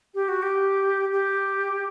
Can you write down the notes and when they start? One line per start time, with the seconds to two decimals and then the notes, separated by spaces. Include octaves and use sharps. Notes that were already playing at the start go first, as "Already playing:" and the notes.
0.15 G4
0.29 F#4
0.42 G4
1.12 G4